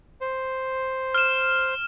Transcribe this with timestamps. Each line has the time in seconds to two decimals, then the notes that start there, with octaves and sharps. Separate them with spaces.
0.21 C5
1.15 F6 E7